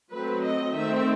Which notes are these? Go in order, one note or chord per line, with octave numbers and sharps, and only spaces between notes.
F#3 A3 C4 B4
D#5
D#3 A3 C4 E5